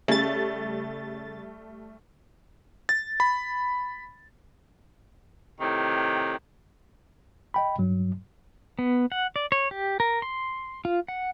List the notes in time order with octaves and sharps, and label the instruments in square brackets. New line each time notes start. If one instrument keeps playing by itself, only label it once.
[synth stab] C#3 A6 [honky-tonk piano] G3 A3
[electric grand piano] A6
B5
[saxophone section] A2 C3 D#3
[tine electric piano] D#5 G5 B5
G2 F#3
[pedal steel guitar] B3
F#5
D5
C#5
G4
A#4
C6
F4
F#5